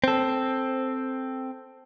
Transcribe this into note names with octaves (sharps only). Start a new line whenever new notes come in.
C4 A4